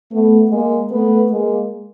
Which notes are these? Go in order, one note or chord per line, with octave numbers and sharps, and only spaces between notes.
A3 B3
G#3 A#3
A3 B3
G#3 A#3